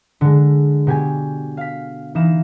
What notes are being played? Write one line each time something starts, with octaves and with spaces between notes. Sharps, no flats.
D3 G#3
B2 G4 G#5
F5 B6
E3 D#4 F5 E7